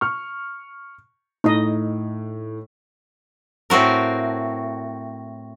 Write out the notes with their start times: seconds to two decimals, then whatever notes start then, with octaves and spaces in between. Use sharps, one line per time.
0.01 C#6 F6
1.44 A2 D#4 D#5
3.70 A2 C4 F#4 A#4